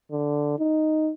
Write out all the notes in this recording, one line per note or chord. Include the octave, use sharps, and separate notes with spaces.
D3
D#4